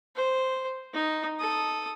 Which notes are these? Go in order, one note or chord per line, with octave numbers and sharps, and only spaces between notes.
C5
D#4
A4 D#6